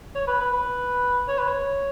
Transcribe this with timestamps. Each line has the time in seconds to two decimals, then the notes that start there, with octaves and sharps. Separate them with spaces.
0.15 C#5
0.27 B4
0.40 B4
0.52 B4
1.28 C#5
1.38 B4
1.48 C#5